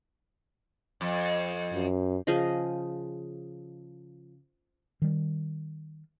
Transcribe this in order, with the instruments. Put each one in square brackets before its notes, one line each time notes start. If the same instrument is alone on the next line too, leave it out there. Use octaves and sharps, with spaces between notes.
[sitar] F2
[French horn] F#2
[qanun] C#3 F3 G#4 D#5
[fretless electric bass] D#3 G3